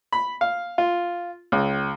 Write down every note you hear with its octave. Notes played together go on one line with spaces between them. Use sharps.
B5
F5
F4
C#2